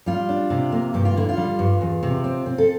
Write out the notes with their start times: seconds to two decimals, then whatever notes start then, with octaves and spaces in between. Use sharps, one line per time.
0.06 G3 F4
0.29 D4
0.50 C3
0.72 A#3
0.94 G2 G4
1.05 F4
1.16 D3 E4
1.29 F4
1.37 G3
1.59 G2
1.81 E2
2.03 C3
2.24 C4
2.46 C4
2.58 A4